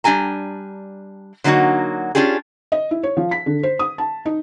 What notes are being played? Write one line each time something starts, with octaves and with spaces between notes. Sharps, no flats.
G3 D4 G4 G#5 A#5
D3 F#3 A#3 D#4 F#4
C#4 D4 F4 G4 G#4
D#5
E4
C#5
F3
B6
D3
C5
D#6
A5
D#4